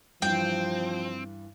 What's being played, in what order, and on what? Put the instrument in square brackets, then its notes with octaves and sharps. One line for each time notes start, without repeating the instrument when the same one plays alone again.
[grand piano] G2 E3 [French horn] F3 [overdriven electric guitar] C4 [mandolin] G5